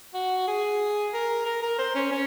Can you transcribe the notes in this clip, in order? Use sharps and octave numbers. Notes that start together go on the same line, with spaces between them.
F#4
G#4
A#4
A#4
A#4
C5
C#4
C#4